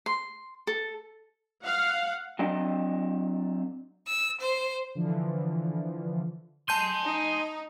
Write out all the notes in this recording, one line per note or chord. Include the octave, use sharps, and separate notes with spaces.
C6
A4
F5 F#5
F#3 C4 D4 D#5
E6
C5
D3 E3 F3
G#5 A5 C6 G6 D#7
D#4